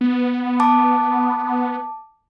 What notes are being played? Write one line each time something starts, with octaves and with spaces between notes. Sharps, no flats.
B3
A5 D6